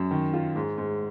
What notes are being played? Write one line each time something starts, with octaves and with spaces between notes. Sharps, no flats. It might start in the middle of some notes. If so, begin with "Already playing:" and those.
Already playing: F#2
D#3
F4
G#2
G#2